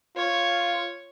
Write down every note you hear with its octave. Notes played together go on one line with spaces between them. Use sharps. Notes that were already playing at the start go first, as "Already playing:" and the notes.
F4 C#5